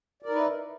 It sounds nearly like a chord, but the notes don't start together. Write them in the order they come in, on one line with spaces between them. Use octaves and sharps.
D5 A#4 D#4 B4 E4